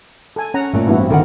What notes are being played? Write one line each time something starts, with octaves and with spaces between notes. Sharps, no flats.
A4 G#5
C#4 F#5 A#5
A#2 A3 D5
A1 G2 B3 E4 F#4
C4
D3 D#3 A4 A#4 F#5